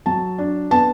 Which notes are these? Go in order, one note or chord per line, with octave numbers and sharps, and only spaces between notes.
F#3 A5
D4
B3 A5